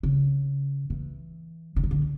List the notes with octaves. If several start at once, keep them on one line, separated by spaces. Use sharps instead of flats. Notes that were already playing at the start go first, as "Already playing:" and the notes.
C#3
E3
D3
E3
D3